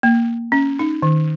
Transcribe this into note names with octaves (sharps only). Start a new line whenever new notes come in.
A#3
C#4
D#4
D#3